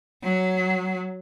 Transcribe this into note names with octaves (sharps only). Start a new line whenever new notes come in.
F#3